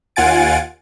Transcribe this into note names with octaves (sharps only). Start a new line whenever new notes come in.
D#2 F4 F#5 G#5 A6 D7